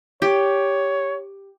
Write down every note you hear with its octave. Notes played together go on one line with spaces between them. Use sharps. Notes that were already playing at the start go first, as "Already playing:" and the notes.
G4 C#5